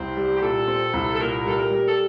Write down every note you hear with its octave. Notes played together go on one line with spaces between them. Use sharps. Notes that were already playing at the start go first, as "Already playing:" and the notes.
Already playing: C2 C4
G3
G4
A#2 A4
C4
C2
A4
A#2 A#4
G3 A4
A#4
G3
A4